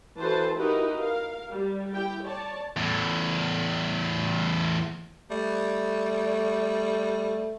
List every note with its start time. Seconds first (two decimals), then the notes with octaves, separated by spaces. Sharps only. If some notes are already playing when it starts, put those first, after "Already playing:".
0.20 E3 F#4 A4 B4 C5 A5
0.57 D#4 E4 F#4 G4 A#4 B4
0.98 A#4 F5
1.51 G3
1.93 E4 G4 G5
2.25 C#5 D5 A5
2.77 E2 A2
5.31 G3 A3